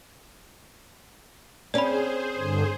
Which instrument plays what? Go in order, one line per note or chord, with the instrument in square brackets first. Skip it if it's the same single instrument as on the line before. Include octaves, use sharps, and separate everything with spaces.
[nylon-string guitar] C4 C#4 [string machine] G#4 C5 [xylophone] D5 B5
[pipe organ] G2 D3